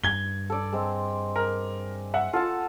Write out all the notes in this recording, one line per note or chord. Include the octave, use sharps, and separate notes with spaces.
G2 G#6 G7
A4 D5
G#3 C4
A#4
E5 F#5
F4 A4 F#5 A5